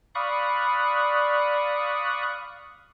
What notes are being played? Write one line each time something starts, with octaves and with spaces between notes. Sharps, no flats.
D5 F5 B5 C#6 D#6 F#6